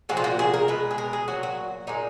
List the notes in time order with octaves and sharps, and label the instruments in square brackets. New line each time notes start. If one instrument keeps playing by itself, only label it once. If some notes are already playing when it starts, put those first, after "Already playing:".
[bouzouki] A#2 F3 G#3 F#4
F4
F#4
G#4
A#4
B2 G#3 B4
G#4
A#4
G#4
A#2 F#3 F#4
F#4
A#2 G#3 D#4